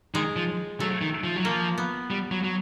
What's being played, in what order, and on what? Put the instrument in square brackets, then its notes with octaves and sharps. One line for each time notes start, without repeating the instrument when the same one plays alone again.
[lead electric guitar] D#3 [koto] G#3
[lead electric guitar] F3
[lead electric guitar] F#3 [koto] A3
[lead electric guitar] D#3
F3
F#3
[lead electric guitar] F3 [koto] A#3
[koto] B3
[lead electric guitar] G3
F#3
F#3